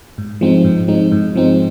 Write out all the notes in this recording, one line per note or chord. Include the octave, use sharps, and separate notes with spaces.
G#2
F3 G#3 C4 D#4
G#2
F3 G#3 C4 D#4
G#2
F3 G#3 C4 D#4